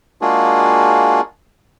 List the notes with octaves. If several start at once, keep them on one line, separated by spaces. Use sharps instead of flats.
G#3 A#3 D4 F4 F#4 G#4